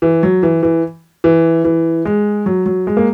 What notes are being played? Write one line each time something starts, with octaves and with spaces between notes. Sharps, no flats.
E3
F#3
E3
E3
E3
E3
G#3
F#3
F#3
G#3
A#3